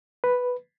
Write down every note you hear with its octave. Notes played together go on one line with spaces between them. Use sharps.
B4